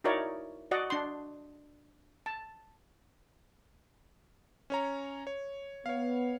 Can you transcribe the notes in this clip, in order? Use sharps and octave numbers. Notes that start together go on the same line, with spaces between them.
D#4 E4 F#4 A#4 C#5 D5
F#4 D5 D#5 F#5
D4 C6
A5
C#4 C#5 A#5
C#5
B3 C#5 F5